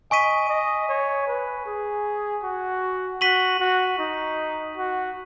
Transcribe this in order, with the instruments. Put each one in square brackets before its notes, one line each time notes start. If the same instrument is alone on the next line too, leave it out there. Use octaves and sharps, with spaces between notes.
[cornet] D#5 [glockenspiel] G#5 C#6 B6 D#7
[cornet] D#5
C#5
B4
G#4
F#4
[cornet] F#4 [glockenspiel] C#6 B6 D#7 F#7
[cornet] F#4
D#4
F#4